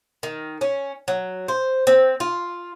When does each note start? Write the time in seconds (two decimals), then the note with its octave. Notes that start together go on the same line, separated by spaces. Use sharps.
0.23 D#3
0.61 C#4
1.08 F#3
1.48 C5
1.87 C4
2.20 F4